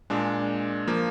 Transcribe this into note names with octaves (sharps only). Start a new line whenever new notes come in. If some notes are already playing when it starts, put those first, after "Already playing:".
A#2 G#3 D4
F3 A#3